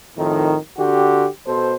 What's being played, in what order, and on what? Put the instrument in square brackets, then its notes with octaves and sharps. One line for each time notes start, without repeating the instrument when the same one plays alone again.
[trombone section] F2 A2 D#3
D3 F#4 G4
B2 A4 C5